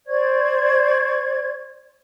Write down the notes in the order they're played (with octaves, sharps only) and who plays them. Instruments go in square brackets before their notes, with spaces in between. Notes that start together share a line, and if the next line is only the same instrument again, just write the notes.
[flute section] C5 D5 C#6 G#6